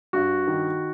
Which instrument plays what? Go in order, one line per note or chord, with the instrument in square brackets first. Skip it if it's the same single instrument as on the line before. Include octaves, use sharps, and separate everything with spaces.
[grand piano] G2 F#4
D#3